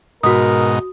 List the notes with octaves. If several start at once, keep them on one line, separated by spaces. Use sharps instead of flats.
G#2 B2 D#4 F#4 A#4 D#6